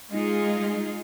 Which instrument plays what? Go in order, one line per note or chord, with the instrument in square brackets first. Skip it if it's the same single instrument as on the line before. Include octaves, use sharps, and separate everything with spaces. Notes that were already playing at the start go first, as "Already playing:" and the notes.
[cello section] G#3 D#4 F4 G#4